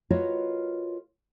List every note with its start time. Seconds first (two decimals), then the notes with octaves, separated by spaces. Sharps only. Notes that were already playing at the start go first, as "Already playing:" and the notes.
0.10 F4 F#4 A#4 B4 C#5 D#5